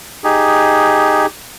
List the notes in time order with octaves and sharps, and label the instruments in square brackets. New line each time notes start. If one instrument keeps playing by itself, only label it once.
[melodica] D#4 G4 G#4